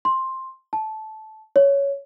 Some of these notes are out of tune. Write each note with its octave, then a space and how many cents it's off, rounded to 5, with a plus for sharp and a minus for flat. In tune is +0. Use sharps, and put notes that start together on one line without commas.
C6 +10
A5 -15
C#5 +10